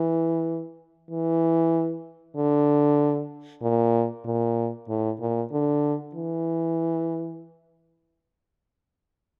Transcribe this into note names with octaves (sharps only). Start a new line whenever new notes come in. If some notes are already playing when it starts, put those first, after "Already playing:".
Already playing: E3
E3
D3
A#2
A#2
A2
A#2
D3
E3